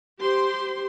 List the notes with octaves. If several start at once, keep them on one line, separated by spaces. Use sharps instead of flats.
G4 C5 C6